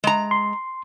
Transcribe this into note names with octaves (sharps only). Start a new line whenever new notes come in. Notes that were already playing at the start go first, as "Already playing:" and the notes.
G#3 A#5
C6